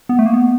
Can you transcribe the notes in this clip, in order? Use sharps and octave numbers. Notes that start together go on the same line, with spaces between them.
B3
A3
A#3
B3